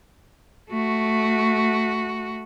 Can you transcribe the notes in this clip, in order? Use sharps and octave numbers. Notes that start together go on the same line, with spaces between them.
A3 F#4